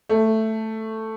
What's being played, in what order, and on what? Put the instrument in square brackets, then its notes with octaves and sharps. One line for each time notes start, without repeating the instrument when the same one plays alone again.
[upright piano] A3